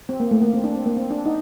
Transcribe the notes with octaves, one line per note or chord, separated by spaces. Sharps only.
C4
A#3
A3
A#3
C4
D4
C4
A#3
C4
D4
D#4